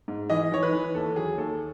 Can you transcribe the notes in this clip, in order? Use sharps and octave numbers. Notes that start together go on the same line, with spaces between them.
G#2
E3 D#5
E3 C#5
B4
E3
D#2 A4
F#3 G#4
D#2 A4